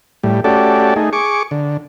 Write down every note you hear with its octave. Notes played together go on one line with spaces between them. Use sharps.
A2 G3
A3 C#4 F#4 G4 A4 D5
A3 D#4 G#4
G#4 C#6 D6
D3